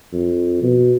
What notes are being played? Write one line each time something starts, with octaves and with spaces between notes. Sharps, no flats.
F2
B2